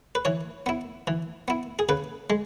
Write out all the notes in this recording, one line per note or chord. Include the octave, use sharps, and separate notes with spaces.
B4
E3 C#5
B3 E4
E3
B3 E4
G#4
C#3 B4
G#3